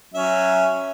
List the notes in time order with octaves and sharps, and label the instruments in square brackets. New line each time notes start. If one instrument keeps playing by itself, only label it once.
[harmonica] F#3 C#4 E5